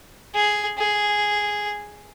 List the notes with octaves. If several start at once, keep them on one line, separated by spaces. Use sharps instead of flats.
G#4
G#4